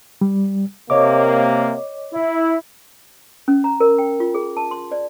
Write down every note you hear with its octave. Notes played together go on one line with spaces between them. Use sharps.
G3
C3 A#3 C#5 D#5 D6
E4
C#4
A#5
A#4
G5
F4
G#4
A5
C6
D5